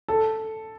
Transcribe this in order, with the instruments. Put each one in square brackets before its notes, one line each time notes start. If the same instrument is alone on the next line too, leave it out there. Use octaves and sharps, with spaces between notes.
[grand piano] A4